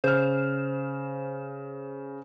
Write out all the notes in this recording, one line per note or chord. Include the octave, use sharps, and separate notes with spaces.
C#3 C5 F6 E7